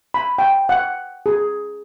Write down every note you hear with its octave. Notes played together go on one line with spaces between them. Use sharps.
B5
G5
F#5
G#4